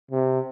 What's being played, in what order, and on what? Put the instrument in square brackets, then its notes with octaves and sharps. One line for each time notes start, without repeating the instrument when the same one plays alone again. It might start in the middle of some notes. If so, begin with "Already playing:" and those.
[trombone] C3